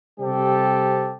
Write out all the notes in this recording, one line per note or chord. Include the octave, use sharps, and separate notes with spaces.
C3 G3 C4 G4 A4